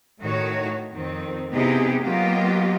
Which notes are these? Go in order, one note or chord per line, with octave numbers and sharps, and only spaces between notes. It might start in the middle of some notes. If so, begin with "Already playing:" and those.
A2 D#3 F#4 C#5
F2 D#3 C4
C3 B3 D#4 E4 G4 G#4
F#3 A#3 B3 F4 G4 D#5